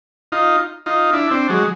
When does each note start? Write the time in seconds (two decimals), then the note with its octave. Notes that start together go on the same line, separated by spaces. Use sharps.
0.32 D#4 F4
0.86 D#4 F4
1.13 D4 E4
1.31 C4 D4
1.49 F#3 G#3